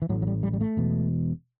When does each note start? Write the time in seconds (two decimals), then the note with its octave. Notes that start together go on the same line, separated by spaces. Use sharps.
0.02 E3
0.09 A2 F#3
0.12 A1
0.22 F#3
0.27 G3
0.43 G3
0.53 G3
0.61 A3
0.77 E1 E2 B2